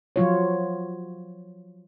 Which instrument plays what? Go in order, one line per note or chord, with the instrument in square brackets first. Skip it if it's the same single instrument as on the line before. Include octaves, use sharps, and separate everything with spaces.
[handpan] F3 F#3 F4 C#5